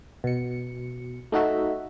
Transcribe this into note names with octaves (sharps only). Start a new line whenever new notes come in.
B2 C#7
A3 D#4 F#4 E5